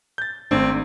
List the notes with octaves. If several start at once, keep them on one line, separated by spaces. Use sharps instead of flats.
G6 A6
G#1 A3 C4 D4